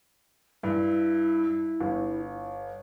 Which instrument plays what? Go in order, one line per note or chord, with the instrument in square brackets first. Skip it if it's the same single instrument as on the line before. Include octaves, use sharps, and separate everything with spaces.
[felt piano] G2 [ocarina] E4
[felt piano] G1